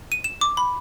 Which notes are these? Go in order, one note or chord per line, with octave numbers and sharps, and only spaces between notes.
D#7
E7
D6
B5